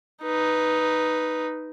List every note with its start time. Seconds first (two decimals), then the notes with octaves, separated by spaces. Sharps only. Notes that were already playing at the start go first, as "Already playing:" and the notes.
0.23 D#4 B4